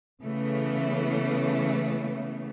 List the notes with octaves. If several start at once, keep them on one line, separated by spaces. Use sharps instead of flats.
C#3 E3 A3 B3 C#4